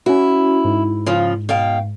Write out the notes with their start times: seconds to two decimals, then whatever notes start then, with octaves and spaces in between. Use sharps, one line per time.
0.06 C#4 E4 F#4
0.64 G#2
1.06 C#3 F3 F4
1.49 B2 F5 G5